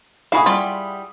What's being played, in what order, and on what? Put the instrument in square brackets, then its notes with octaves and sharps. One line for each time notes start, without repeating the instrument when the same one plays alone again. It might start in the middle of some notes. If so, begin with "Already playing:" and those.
[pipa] E4 F#4 G#4 [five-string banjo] F5 [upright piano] F#5 B5 D#6
[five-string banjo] G3 [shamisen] F4